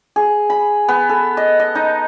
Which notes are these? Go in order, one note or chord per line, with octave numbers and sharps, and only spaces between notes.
G#4
B5
B3
A4
D#5
D#5
D#4